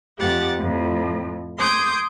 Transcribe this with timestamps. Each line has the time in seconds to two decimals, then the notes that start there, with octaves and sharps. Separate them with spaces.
0.17 F2 A3 G4 F#5 A6
0.56 F2 A2
1.57 C6 D6 D#6 G6 G#6